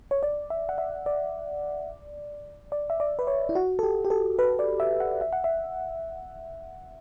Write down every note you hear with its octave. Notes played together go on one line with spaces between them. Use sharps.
C#5
D5
E5
F#5
E5
D5
D5
E5
D5
B4
C#5
E4
F#4
A4
G4
G4
A4
B4
D5
E5
F#5
E5
F#5
E5